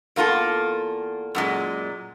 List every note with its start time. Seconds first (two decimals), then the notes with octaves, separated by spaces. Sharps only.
0.16 E2 A#3 F4 A4
1.35 F#2 A#2 G#3